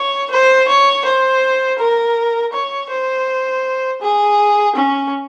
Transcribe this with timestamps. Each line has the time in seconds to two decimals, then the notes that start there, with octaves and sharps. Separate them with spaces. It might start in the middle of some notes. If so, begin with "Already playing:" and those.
Already playing: C#5
0.30 C5
0.68 C#5
1.05 C5
1.78 A#4
2.53 C#5
2.90 C5
4.01 G#4
4.76 C#4